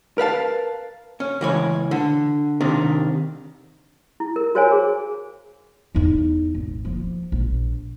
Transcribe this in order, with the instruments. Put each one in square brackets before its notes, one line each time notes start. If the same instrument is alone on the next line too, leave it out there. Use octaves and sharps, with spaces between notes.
[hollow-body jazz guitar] A#4 B4 F5 A5
C#4
C#2 E3 C#5
D3
C3 D#3 D4
[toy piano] E4
A#4
F#4 A#4 C5 C#5 F5 G#5
G#4
[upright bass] E2 D#4
G#1
F3 A#3
A#1